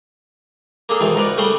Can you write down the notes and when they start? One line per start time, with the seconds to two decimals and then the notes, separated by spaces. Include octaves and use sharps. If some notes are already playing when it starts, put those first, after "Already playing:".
0.89 A#3 D4 G#4 A4
1.01 E2 G#2 B2 D#3 E3
1.15 C#2 G#2 A#4 B4 D5
1.38 C#3 G3 A3 F#5 C6